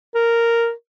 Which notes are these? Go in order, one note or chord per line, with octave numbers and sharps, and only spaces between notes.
A#4